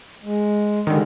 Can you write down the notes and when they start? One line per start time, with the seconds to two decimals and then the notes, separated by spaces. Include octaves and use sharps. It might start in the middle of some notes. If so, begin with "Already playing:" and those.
0.23 G#3
0.87 D3 D#3 G3 G#3